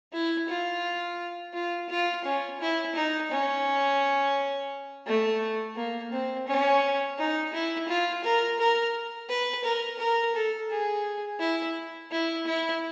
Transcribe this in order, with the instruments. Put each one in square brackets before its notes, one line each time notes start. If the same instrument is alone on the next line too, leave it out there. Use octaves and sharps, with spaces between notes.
[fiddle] E4
F4
F4
F4
C#4
E4
D#4
C#4
A3
A#3
C4
C#4
D#4
E4
F4
A#4
A#4
B4
A#4
A#4
A4
G#4
E4
E4
E4